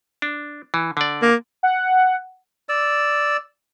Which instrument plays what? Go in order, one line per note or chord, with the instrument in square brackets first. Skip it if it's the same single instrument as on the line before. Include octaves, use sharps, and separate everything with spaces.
[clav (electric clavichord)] D4
E3
D3 D5
[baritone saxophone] A#3
[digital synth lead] F#5
[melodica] D5 E6